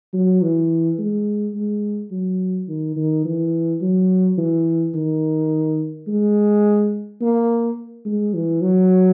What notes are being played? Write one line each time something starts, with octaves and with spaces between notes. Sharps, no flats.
F#3
E3
G#3
G#3
F#3
D#3
D#3
E3
F#3
E3
D#3
G#3
A#3
G#3
E3
F#3